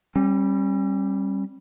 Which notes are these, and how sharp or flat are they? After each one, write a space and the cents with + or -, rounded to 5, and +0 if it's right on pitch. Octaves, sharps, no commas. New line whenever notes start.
G3 +0 C#4 -40